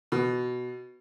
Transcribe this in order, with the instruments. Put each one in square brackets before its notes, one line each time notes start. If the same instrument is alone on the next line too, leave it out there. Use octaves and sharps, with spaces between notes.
[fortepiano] B2